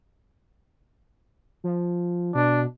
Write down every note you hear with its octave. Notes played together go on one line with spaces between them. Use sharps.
F3
B2 D4